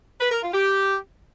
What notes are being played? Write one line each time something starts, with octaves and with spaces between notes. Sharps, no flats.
B4
A#4
F4
G4